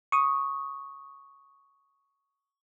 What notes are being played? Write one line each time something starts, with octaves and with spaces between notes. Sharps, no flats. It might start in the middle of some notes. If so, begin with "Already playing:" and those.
C#6 D#6